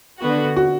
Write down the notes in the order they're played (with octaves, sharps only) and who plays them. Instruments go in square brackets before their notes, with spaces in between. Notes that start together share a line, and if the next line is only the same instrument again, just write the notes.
[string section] D3 B3 F#4
[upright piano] F#4